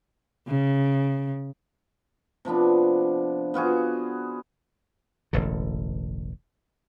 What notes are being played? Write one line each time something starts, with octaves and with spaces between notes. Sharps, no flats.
C#3
C3 F3 B3 D4
B3 F4 F#4 G#4
E1 A1 D3